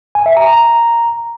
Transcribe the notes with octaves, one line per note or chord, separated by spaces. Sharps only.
G#5
E5
A#5
A#5